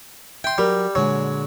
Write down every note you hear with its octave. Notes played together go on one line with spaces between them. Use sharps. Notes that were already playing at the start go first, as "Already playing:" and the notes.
E5 G5 C6
F#3 G3 G4 A#4
A#2 D3 F#3 G#3